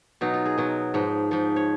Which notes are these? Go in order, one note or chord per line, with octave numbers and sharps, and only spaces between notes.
B2 F#3 D#4
F4
G#4
B2 F#3
G#2 F3
G#2 F3
C#5